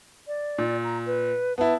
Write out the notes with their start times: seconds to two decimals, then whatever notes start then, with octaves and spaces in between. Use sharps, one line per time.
0.27 D5
0.58 A#2
0.84 A#5
1.06 B4
1.58 B3 E4 A5